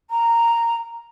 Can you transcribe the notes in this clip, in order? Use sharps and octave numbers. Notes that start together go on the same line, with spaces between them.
A#5